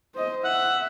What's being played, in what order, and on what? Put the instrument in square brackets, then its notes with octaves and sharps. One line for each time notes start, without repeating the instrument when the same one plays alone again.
[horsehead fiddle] C5 D#5
[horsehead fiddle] E5 [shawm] F#5